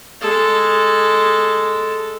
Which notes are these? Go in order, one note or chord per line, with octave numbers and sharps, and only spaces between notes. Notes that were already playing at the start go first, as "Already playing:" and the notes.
G#3 A4